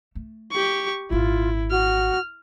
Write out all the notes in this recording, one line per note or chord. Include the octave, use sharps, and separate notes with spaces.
A3
G4 C#6
G#1 A#2 E4 F4
F#4 F6